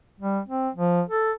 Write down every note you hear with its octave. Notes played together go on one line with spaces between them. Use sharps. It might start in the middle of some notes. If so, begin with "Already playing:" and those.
G3
C4
F3
A4